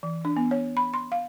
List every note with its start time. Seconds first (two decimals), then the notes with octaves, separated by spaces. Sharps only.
0.03 E3
0.25 D4
0.37 B3
0.51 C#5
0.77 B5
0.94 C6
1.12 F5